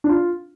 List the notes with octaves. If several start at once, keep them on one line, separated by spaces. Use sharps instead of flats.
D4
F4